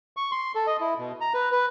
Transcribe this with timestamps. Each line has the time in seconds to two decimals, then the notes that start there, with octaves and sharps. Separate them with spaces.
0.17 C#6
0.32 C6
0.55 A4
0.67 D#5
0.80 E4
0.98 B2
1.21 A#5
1.34 B4
1.52 B4